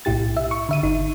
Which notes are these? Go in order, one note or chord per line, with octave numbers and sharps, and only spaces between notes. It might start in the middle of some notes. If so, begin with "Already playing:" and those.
B1 A2 E4 G4 A6
E5
C#6
D3 E5 D#7
G1 D#4